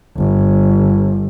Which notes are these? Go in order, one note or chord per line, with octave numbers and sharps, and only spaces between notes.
G1